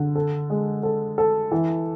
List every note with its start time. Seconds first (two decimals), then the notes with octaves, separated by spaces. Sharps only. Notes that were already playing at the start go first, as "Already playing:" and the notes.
Already playing: D3
0.15 A4
0.50 G#3
0.83 A4
1.18 A4
1.51 E3